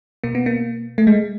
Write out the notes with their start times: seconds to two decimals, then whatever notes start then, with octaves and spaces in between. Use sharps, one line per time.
0.24 B2 A#3
0.35 B3
0.46 A#3
0.98 A3
1.07 G#3